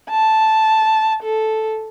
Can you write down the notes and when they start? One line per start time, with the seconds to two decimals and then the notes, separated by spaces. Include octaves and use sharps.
0.11 A5
1.23 A4